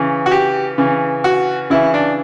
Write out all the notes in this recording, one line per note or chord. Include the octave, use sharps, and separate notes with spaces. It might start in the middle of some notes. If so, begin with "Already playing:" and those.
Already playing: C#3 E3
F#4
G4
C#3 E3
F#4
C#3 E3 E4
D4